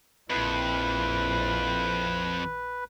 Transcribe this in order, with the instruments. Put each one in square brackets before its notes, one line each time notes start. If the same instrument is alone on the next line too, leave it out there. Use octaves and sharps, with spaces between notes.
[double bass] A#1 E4 [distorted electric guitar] F2 [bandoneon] B4